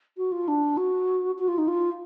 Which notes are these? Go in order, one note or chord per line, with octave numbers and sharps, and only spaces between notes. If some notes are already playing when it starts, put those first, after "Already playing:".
F#4
F4
D4
F#4
F#4
F4
D#4
F4